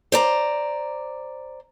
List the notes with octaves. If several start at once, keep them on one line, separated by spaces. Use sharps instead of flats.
C5 D5 A#5